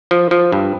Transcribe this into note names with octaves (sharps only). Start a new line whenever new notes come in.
F3
F3
G2